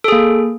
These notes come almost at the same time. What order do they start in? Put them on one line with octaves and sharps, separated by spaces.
A4 G#4 A#3